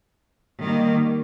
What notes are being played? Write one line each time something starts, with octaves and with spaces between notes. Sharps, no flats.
D#3 G3 A#3